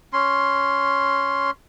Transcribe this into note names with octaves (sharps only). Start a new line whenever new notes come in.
C#4 C6